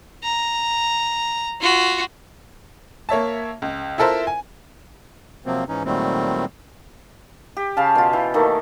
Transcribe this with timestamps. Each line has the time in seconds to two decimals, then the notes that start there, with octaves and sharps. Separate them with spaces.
0.23 A#5
1.61 F4 F#4
3.09 A#3 C#5 E5 A5
3.62 C#2
3.98 E4 F4 A4 A#4 C5 E5
4.27 G#5
5.46 C3 F3 F#3 A#3 C4
5.68 G#2 E3 C#4 D#4
5.85 A#2 D#3 F#3 G3 A3 C4
7.57 G4
7.77 C#3 C#4 F5 A5
7.95 B2 F4
8.13 E3
8.34 D#3 A3 A#3